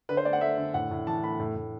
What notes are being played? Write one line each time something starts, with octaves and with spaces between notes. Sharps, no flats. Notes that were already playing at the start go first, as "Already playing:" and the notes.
D3 B4
C5
A3 D5
F#5
A3 E5
D3
A2 F#5
A2
E3 A5
A3 B5
A2
A2